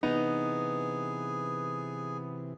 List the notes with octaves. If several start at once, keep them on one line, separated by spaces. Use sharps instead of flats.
C3 E3 B3 D#4 G#4